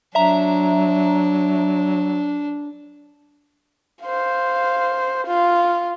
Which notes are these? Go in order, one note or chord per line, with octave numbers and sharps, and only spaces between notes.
F#3 D4 E5 A#5
C5 F5
F4